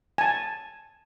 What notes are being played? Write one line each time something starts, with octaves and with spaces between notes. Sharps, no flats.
G#5 A5